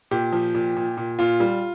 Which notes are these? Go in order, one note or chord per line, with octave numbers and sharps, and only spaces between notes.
A#2 G4
F3
A#2
A#2
A#2
A#2 F4
G3